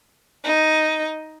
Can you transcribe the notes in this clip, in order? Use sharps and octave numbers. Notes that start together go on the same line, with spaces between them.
D#4 D#5